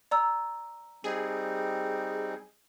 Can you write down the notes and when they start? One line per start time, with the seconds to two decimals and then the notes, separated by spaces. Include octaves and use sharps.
0.11 D5 A#5 E6
1.04 G3 C4 D#4 G#4